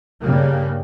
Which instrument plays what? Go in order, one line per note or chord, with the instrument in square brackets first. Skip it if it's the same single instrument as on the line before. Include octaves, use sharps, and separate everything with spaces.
[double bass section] G2 C#3 G3 A#3